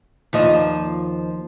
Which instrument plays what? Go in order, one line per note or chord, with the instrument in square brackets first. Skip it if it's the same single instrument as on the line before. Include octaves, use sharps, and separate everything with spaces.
[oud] D#2 F3 D#5